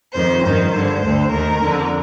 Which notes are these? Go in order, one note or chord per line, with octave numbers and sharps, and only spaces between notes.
F2 D#3 C5
G2 D#3 C5
G2 D3
D2 D3
D#2 D#3 A#4
F2 D3